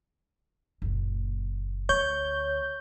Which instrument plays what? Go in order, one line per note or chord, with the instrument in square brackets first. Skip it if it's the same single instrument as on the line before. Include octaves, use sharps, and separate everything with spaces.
[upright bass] F#1 A#2
[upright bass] D2 D3 [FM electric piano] C#5 G6